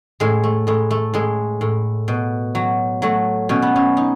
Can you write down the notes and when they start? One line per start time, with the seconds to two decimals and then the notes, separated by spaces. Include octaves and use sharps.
0.20 A2 G#3
0.44 A3
0.67 A2 G#3
0.91 A3
1.14 A2 G#3
1.61 A2
2.08 B2
2.55 F#3
3.02 F#3 A3
3.49 B2 C#4
3.62 B3
3.76 C#4
3.97 D#4